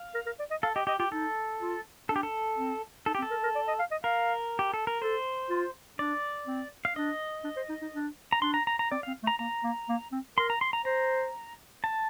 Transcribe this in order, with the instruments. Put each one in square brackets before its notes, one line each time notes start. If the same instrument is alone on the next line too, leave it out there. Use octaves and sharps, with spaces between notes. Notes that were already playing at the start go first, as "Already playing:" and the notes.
Already playing: [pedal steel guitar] F5
[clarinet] A#4
A#4
D5
D#5
[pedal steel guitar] A4 [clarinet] F5
[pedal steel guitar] G4 [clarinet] D#5
[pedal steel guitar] G4 [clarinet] D#5
[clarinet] F4 [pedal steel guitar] G4
[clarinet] D#4 [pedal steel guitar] A4
[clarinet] F4
[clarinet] D4 [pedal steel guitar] A4
[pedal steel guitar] G4
A4
[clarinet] C4
[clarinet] D#4 [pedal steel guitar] A4
[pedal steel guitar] G4
[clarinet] C4
[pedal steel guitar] A4
[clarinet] A#4
A#4
D5
D#5
F5
D#5
[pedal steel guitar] A#4 [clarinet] F5
[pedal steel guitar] G4
A4
A#4
[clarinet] A4 [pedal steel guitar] C5
[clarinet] F4
[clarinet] D4 [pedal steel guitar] D5
[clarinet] C4
[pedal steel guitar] F5
[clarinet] D4 [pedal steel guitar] D#5
[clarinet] D4
C5
D#4
D#4
D4
[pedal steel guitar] A#5
[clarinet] D4 [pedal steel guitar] C6
[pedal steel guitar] A#5
A#5
A#5
[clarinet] C4 [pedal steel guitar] D5
[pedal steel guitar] F5
[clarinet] C4
A3
[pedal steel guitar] A#5
[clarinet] A#3 [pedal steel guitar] A#5
[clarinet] A#3
A#3
C4
[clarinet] A#4 [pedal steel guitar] C6
[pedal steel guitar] A#5
C6
A#5
[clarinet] C5 [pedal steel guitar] A#5
[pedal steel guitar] A5